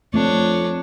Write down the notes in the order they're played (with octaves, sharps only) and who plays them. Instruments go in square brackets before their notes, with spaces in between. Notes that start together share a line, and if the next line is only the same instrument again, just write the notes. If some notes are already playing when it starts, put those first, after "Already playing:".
[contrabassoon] F2 [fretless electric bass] A3 [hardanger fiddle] D4 C#5